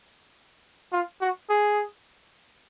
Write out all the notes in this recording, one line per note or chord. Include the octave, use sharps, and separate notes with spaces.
F4
F#4
G#4